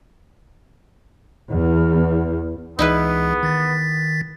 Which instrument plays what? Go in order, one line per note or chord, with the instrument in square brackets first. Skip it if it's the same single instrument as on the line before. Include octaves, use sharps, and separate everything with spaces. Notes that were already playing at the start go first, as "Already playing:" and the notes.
[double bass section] E2
[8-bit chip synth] C#2 E3 G#4 [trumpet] B3 [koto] D#4 E4 B4
[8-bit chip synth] D#3 A6 B6